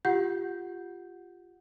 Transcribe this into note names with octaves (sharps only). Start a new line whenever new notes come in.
F4 G4 F#5 G6